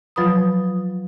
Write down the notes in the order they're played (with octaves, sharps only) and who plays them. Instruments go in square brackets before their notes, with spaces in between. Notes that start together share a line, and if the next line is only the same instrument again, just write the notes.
[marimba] F3 F#3 F4 B4 B5 D#6